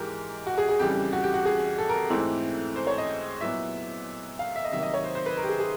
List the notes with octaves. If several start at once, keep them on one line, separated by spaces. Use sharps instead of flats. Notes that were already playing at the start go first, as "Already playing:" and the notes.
Already playing: G#2 E3 G#3 G4 A#4
F#4
G#4
G#4
F2 C#3 E3 G3 G4
F#4
G4
F#4
G#4
A4
A#4
G#2 E3 A3 C4 E4
C5
C#5
D#5
A#2 F#3 B3 E4 E5
F5
E5
D#5
C3 D#3 F#3 A#3 E5
D#5
C#5
C5
C5
B4
A#4
G4
G#4
G#4